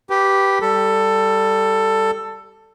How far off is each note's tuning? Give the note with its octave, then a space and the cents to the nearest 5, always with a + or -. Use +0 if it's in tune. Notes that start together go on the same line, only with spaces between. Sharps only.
G4 -5 B4 +0
G3 +0 A4 +15